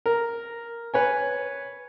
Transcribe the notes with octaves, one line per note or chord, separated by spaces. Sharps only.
A#4
B4 C#5 G#5